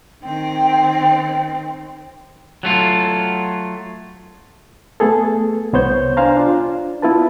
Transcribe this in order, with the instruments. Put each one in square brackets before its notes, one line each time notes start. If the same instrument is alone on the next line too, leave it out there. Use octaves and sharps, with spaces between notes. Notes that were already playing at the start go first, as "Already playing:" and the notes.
[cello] D#3 C4 [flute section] G5
[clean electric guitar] F#3 A3 F4
[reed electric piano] A3 B3 G#4 A4
C2 B3 C5 C#5 G6
D4 C5 F5 G#5 A#5
D4 F4
B3 E4 F4 B4 A5